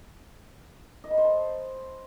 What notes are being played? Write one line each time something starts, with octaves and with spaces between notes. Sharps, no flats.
D#5
B5
C5
A5